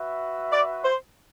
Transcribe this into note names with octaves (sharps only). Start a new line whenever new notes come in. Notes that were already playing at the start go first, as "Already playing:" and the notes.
Already playing: F#4 B4 E5
D5
C5